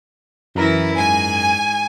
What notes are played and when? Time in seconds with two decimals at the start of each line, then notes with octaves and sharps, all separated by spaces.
0.55 F#2 E3 E4 A#4 A#6
0.97 G#2 G#5